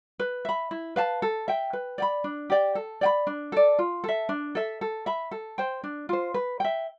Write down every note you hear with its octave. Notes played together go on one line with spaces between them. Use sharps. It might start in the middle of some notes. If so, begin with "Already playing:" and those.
B4
E5 B5
E4
B4 F5 A5
A4
E5 G5
B4
D5 G5 B5
D4
G4 D5 G5
A4
D5 G5 B5
D4
A4 D5
F4
A4 E5
D4
A4 E5
A4
E5 B5
A4
C5 G5
D4
F4 C5
B4
E5 G5